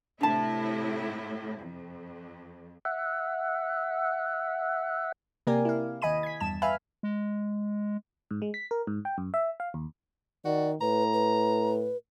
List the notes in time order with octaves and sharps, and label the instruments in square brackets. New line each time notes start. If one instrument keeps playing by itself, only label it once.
[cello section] A2 C3 E4 [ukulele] D4 A5
[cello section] F2
[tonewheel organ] E5 F#5
[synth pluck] C3 A#3 G4 A#4 D5 G#5
E4 F5
D#2 D#5 G#5 B5 D#7
G#6 B6
E2 G2 A5 E7
B4 E5 F5 G#5 B5 F6
[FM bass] G#3
[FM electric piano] G#2
G#3
B6
A#4
G#2
G5
F#2
E5
F5
D#2
[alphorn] D#3 [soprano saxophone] F#4 [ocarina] D5
[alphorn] A2 [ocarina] B4 [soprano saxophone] A#5
[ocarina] B4